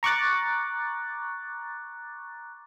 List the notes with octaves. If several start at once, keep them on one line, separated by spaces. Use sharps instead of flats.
A#5 C#6 D6 F#6 A6